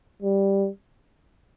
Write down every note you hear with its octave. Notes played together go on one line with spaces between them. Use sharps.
G3